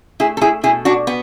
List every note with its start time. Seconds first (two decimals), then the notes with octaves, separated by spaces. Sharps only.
0.20 A3 E4 G#4
0.37 A4
0.41 E4 G#4
0.63 B2 E4 G#4
0.85 D4 F#4
1.07 B3